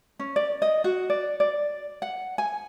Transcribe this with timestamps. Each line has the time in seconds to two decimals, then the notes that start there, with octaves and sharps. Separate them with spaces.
0.19 C#4
0.36 D5
0.62 D#5
0.84 F#4
1.10 D5
1.40 D5
2.02 F#5
2.38 G#5